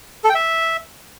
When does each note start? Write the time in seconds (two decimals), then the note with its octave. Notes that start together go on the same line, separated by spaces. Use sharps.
0.24 A4
0.29 G5
0.35 E5